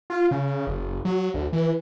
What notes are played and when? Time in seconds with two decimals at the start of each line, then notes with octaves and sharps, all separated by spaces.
0.10 F4
0.31 C#3
0.67 F#1
1.05 F#3
1.34 D2
1.53 E3